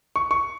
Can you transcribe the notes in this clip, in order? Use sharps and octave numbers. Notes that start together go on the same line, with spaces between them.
C#6
C#6